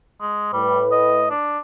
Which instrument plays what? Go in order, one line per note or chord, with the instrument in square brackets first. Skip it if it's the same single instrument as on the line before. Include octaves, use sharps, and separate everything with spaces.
[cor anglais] G#3
[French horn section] A2 B4 [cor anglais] G3
[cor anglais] D#5
D4